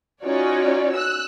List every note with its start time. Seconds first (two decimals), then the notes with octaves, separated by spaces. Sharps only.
0.23 C#4 D#4 F4 F#4 C#5 D5
0.93 E6 F#6